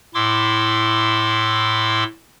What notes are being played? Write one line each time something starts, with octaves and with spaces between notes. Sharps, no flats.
A2 E4 C6 D6 E6